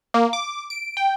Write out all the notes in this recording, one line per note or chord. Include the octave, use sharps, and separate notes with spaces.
A#3
D6
D7
G5